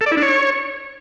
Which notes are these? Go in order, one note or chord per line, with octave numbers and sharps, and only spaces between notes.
A4
D5
E4
D4
C#5